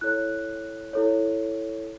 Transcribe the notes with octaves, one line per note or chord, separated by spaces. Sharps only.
E4 A4 C#5 F#6
E4 A4 C#5